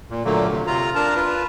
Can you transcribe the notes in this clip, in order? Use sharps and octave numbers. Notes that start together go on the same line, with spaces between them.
A#2
A#2 D3 F#3 A3 A#3
C3
C3 F4 A#5
D4 A#4 A5 A#5
F4 B4